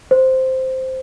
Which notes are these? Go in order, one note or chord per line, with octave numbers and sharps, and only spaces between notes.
C5